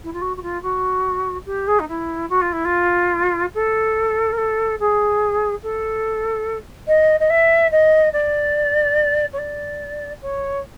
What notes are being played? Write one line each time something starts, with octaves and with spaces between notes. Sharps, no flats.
E4
F4
F#4
F#4
F4
F#4
G4
G#4
D#4
E4
F#4
F4
E4
F4
A4
A#4
A4
G#4
A4
D#5
D#5
E5
D#5
D5
C#5
D5
C#5